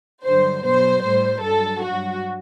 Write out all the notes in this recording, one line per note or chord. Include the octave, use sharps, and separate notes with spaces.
G2 D3 F#3 C5
B2 F#3 C5
A2 G3 C5
G2 F#3 A4
G2 F#3 F#4